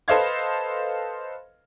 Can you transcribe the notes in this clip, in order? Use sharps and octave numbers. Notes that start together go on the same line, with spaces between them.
A4 B4 C5 D#5 F5 G#6